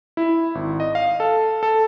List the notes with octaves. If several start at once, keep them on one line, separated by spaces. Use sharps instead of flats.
E4
G#1
D#5
F5
A4
A4